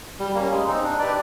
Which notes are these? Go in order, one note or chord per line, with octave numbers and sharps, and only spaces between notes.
G3
A#3 C#4
G#3
C4 D#4
D4
G4 B4 D5